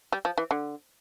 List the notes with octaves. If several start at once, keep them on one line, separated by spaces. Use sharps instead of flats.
G3
F3
E3
D3